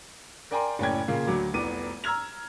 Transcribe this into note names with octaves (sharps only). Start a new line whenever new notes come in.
A#4 D5 G5 G#5 A#5 C6
F#1 A2 C#4 D5 G5 G#6
A#2 C#3 A#3 F5
D2 F#3 D6
F1 C2 B3 D6 D#7
A#5 E6 F6 G#6 F7